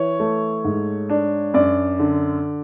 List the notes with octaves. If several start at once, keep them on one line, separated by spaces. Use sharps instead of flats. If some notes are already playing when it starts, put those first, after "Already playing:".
Already playing: E3 C#5
A3
G#2
D4
F#2 D5
D3